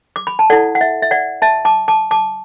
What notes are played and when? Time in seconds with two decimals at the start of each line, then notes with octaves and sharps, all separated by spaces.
0.16 D6
0.27 B5
0.39 A5
0.50 E4 A4 D5 F#5
0.75 F#5
0.81 E5
1.02 E5
1.11 D5 F#5
1.42 E5 A5
1.65 A5 D6
1.88 A5 D6
2.11 A5 D6